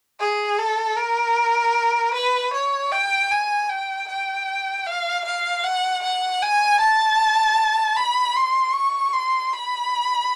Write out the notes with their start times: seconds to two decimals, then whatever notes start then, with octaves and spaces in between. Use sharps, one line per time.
0.20 G#4
0.58 A4
0.97 A#4
2.14 B4
2.53 C#5
2.91 G5
3.31 G#5
3.69 G5
4.08 G5
4.86 F5
5.25 F5
5.63 F#5
6.03 F#5
6.42 G#5
6.80 A5
7.97 B5
8.36 C6
8.74 C#6
9.13 C6
9.53 B5